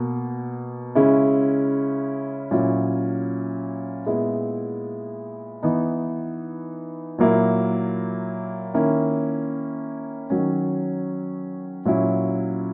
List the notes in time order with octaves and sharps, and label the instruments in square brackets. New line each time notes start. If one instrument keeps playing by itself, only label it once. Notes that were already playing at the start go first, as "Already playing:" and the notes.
Already playing: [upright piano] B2 A#3
C#3 G#3 C#4 E4
A#2 F#3 C#4 E4
A#2 G#3 B3 E4
E3 B3 D#4
A#2 F#3 A#3 E4
D#3 A#3 C#4 E4
D#3 F#3 C#4
A#2 F#3 C#4 E4